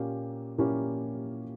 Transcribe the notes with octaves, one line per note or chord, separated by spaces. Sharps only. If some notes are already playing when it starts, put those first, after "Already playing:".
Already playing: A#2 A#3 C#4 G4
A#2 A#3 C#4 E4 G4